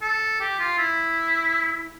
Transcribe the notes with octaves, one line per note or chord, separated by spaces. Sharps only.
A4
G4
F4
E4